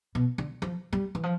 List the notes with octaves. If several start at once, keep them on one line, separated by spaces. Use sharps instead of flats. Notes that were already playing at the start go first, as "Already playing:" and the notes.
B2
D3
F3
G3
E3
F3